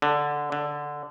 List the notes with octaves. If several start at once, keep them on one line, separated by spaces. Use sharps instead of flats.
D3
D3